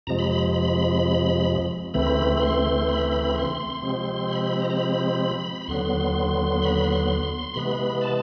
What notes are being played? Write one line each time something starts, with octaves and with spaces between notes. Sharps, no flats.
F2 C3 F3 G#3 A#5
B5
B5
B5
D2 C#3 E3 A3 C4 B5
B5
C6
B5
B5
C6
C3 F3 G#3 C4
B5
B5
A#5
A#5
B5
B5
D#2 D3 F#3 B3 C6
B5
C6
C3 E3 G#3 B3 B5
A5